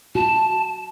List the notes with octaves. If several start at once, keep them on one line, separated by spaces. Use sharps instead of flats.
F#4 A5